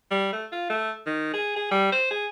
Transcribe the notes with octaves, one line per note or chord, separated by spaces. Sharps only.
G3
A3
F4
A3
D#3
G#4
G#4
G3
C5
G#4